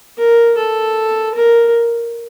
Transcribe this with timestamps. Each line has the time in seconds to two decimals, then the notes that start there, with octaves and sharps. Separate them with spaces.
0.18 A#4
0.58 A4
1.35 A#4